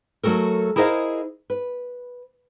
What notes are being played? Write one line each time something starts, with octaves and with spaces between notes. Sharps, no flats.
F#3 A3 F#4 A4 A#4
E4 G#4 A#4 C5 D#5 F5
B4